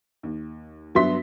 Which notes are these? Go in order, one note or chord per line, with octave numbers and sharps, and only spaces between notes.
D#2
G2 F#3 B3 E5 C6 B6